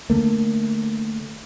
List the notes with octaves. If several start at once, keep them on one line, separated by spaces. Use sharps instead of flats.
D3 A3 A#3